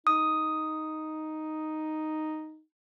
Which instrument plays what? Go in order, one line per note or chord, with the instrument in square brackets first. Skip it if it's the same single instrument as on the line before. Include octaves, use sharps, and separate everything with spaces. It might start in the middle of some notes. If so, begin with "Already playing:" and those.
[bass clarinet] D#4 [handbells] D#6